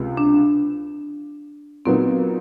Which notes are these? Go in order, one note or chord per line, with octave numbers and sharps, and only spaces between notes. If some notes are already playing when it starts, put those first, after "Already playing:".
Already playing: C#2 C3 G#3
D4
A#2 F#3 B3 C4 D#4